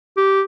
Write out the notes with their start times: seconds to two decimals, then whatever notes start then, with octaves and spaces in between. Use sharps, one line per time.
0.17 G4